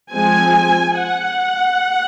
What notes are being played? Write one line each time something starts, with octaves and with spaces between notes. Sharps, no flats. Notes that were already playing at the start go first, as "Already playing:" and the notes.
F3 G#3 C4 G#5
F#5